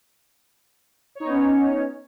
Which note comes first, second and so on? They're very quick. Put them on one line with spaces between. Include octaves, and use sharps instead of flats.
C#5 D#4 B3 C#4